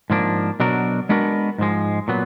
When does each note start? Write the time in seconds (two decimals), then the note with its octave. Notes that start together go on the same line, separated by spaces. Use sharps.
0.10 G#2 F3 A#3 D4
0.60 B2 F#3 D4 F#4 A#4
1.09 G#3 B3 D4 F#4 A#4
1.58 G#2 F3 G#3
2.08 A#2 F#3 B3